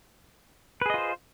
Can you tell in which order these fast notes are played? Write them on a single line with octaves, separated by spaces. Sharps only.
B4 G#4 D#5 F4 C5